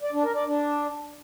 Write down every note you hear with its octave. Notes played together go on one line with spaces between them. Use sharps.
D5
D4
A#4
D5
D4